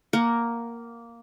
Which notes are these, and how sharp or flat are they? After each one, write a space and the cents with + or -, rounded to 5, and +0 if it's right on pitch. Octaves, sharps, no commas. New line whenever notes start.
A#3 +0 A#4 +0 F#5 +20